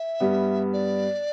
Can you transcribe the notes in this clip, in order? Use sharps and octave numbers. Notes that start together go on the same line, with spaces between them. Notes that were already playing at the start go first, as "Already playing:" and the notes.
Already playing: E5
G2 G3 B3
D5